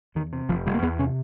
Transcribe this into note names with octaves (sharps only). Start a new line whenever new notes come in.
E2 D#3
C3
F1 F3
F1 G3
A#3
E2 B3
C3 C#4